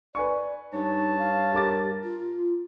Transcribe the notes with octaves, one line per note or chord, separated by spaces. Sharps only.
B4 D5 G#5 C#6
G2 D#4 C#5 A5
F5
G4 A#4 D6 A6
F4